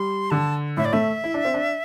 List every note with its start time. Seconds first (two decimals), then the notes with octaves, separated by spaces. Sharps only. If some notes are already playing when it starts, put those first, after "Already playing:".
Already playing: G3 C6
0.30 D3 A5
0.77 A2 E5
0.85 D5
0.93 A3 E5
1.24 E4
1.34 D4
1.45 C4
1.54 D4